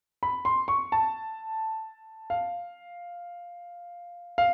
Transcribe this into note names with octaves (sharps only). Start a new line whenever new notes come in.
B5
C6
C#6
A5
F5
F5